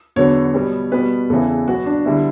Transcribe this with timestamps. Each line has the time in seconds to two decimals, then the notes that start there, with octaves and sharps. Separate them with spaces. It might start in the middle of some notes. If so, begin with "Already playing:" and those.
0.16 E2 D3 F#3 B3 C#5
0.54 B2 G3 B3
0.92 B2 G3 B3 B4
1.30 E2 C#3 E3 A4
1.68 B2 F#3 B3 F#4
1.86 D4
2.05 D3 G3 B3 E4